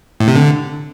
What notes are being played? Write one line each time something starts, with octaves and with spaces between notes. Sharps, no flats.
A2
C3
D3